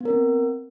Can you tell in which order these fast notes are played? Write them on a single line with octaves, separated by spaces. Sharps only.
B3 A#4 C4